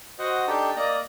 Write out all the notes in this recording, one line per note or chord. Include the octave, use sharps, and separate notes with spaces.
F#4 C5 D#5 F#5
D4 D#4 G4 A4 G5 A5
A#3 D5 D#5 A#5